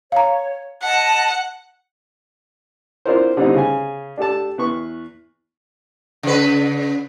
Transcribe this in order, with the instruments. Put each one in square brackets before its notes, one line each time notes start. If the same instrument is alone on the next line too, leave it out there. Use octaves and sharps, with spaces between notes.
[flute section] C#5 [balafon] F5 A#5
[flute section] D#5 A5 [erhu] F#5
[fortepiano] C4 D4 E4 F4 A#4 C5
D3 G3 B3 C4 D#4 E4
C#3 G#5
D4 G4 A4 A5
E2 B4 C#6
[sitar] C#3 B4